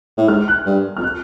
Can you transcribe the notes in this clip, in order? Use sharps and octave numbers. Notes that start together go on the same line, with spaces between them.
A2
G#2 F6
F#6
G2
F2 F6
F#6